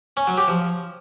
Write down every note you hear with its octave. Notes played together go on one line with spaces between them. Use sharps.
C#4
F#3
G4
F3